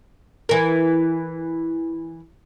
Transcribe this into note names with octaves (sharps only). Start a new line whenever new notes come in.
E3 A#4